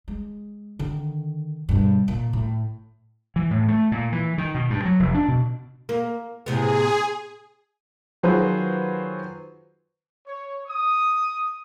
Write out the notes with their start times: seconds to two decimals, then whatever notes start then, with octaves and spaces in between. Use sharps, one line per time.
0.08 G#3
0.79 D3 D#3
1.69 G2 B2
2.08 A#2
2.33 A2
3.36 E3
3.51 A2
3.68 A3
3.92 A#2
4.12 E3
4.38 D#3
4.55 B2
4.70 G2
4.85 F#3
5.00 F1
5.14 D4
5.28 B2
5.89 A#3
6.46 A2 C3 B3 G#4
8.23 D#3 F#3 F4 G#4 B4 C5
10.27 C#5
10.67 D#6